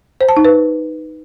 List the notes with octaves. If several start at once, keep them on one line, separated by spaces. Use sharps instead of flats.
C5
A5
D#4
B4